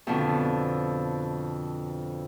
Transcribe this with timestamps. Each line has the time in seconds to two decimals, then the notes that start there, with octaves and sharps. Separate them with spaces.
0.07 F2 B2 D3